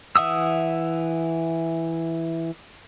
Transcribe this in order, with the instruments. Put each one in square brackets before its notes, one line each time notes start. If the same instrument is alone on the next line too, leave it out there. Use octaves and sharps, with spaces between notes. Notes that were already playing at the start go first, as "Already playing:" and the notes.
[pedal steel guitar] E3 E5 F#5 D#6 E6